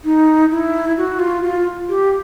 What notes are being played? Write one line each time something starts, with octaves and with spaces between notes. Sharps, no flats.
D#4
E4
F#4
F4
F4
G4